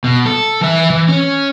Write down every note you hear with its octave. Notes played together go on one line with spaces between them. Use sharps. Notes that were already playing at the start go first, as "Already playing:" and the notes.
B2
A4
E3 E5
E3
C#4